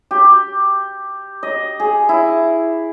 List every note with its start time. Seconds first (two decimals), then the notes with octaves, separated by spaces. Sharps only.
0.11 G4
1.43 D#5
1.80 G#4
2.09 E4